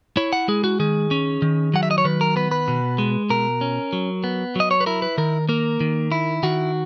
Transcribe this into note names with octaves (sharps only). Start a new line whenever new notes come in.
E4 C#5
F#5
G#3 G#4
F#4
D#3 G#4
C#4
D#3
F#3 F#5
E5
D#5
C#5
D#3 B4
A#4
B3 B4
B4
B2
G#3
B2 A#4
C#4
F#3
B3
F#3 D#5
C#5
B4
E4 A#4
B4
D#3 A#4
A#3 A#4
D#3
E4
D#3 F#4